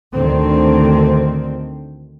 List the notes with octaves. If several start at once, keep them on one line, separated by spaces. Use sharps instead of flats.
D2 D3 D#3 C4